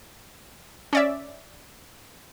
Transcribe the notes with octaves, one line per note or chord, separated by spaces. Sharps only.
C#4 D5 E5